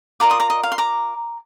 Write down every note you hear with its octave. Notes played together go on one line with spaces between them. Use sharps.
F4 A#4 D5 A#5 D6
C6 D#6
A#5 D6
D#5
F5
C6
A#5 D6